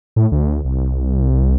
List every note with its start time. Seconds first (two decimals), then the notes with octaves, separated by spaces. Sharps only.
0.16 A2
0.32 D2
0.65 C2